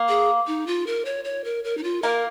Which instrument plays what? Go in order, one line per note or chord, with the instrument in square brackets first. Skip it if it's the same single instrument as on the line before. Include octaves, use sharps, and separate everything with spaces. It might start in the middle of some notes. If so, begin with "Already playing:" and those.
Already playing: [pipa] A#3
[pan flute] G#4
D#4
F4
A#4
C#5
C#5
A#4
A#4
D#4
F4
[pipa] A#3 [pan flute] A#4